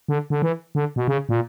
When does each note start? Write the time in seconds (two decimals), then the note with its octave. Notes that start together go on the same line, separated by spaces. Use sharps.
0.08 D3
0.30 D3
0.42 E3
0.75 D3
0.96 B2
1.08 C#3
1.29 A#2